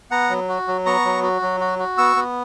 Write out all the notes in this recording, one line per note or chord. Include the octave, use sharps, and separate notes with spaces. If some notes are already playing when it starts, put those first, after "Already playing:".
B3 F#5 A#5
F#3
F#4
F#3
B3 A#5 C#6
F#3
F#4
F#3
F#4
F#4
B3 C#6 E6
B3